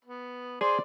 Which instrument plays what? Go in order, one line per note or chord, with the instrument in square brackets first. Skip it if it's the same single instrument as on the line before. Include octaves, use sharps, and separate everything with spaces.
[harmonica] B3
[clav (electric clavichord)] G#4 G#5 [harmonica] C5 [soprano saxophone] D5 [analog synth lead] C6